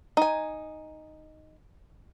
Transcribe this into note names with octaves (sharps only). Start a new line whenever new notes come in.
D#4 G#5